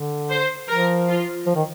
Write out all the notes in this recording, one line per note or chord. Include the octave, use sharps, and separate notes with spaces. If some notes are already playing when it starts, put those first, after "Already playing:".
Already playing: D3
C5
F3 A#4
F4
F3
D#3